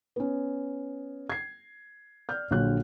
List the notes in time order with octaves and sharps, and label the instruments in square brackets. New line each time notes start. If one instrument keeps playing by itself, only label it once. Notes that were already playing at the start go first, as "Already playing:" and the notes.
[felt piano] B3 C#4
G#6 C7
D5 F6 G6
A#1 D3 F#3 C#5 F#6